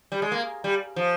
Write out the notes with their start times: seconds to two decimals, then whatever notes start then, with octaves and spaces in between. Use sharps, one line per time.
0.12 G3
0.22 G#3
0.32 A#3
0.64 G3
0.96 F3